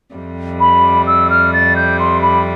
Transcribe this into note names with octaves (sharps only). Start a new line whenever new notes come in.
F2 C3 G3
B5
E6
F6
A6
G6
C6
B5